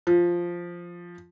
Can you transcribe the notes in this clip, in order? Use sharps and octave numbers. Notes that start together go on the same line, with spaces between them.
F3